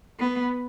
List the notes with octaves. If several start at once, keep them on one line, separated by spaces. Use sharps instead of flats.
B3